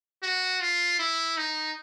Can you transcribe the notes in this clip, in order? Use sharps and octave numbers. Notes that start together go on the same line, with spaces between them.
F#4
F4
E4
D#4